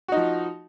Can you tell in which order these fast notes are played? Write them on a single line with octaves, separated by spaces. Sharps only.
F#4 D#4 F3